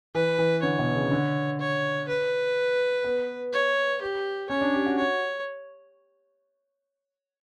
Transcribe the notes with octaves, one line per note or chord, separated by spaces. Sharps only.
E3 B4
E3
D3 C#5
B2
C#3
D3
C#5
B4
B3
C#5
G4
C#4 C#5
D4
G4
F#4
C#5